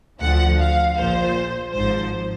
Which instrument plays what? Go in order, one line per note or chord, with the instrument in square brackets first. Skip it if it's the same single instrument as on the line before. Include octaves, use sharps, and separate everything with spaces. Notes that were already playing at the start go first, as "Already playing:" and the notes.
[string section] D2 D3 F3 F#5
F5
A#1 A#2 F3 C5
G#1 G#2 F3 C5